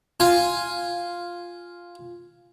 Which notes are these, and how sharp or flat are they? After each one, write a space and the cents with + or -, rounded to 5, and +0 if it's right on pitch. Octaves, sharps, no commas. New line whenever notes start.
F4 +0 G#5 +0